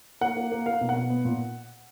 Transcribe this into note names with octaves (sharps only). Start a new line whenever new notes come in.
A#3 F#5
A#3
A#3
A#3 F5
B2
F#5
B2
B3
A#2